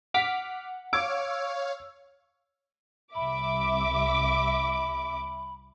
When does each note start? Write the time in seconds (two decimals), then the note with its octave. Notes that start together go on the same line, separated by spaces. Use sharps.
0.14 F#5 D6 F6 B6
0.93 C#5 F5 D6 E6 G#6
3.15 C2 E5 B5 D6